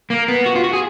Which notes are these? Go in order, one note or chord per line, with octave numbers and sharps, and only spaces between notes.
A#3
B3
F#4
F4
F#4
G#4